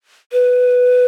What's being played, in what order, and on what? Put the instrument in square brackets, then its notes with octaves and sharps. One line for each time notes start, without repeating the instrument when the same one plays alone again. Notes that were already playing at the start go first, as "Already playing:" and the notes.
[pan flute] B4